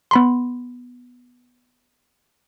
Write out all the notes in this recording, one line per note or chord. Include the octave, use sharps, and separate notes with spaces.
B3 B5 C6